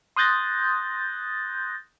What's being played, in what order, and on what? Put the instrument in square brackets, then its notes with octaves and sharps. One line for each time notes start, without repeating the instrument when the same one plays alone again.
[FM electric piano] C6 D#6 F#6 G6 A6 A#6